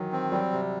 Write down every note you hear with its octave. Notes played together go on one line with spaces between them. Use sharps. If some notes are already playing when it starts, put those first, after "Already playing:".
Already playing: D#3 E3 F#3
C4
F#3 G3
C3